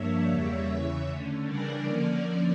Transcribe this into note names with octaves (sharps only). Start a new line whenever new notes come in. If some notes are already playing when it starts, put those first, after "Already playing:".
Already playing: G2 F3 A#3 D4 C#5 E5
E2 C#3 G3 A#3
E2 C#3 E3
D3 A3 C#4
C#3 E3 G3 D4 A#4 D5
D3 F3 A#3 C#4